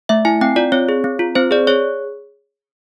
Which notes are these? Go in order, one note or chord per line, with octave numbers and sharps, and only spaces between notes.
A3 E5
E4 G#5
C4 G5
F4 D5
C4 C#5
G#4
C4
F4
C4 C5
G#4 D5
G#4 C#5